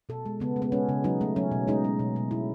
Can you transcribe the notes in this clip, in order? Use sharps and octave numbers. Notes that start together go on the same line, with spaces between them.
B2 A4
G#3
C#3 B3
G#3
B3
G#3 C#4
C#3
F#3 D#4
A3
F#3 C#4
B2
G#3 D#4
G#3
B2
B2
B2 E4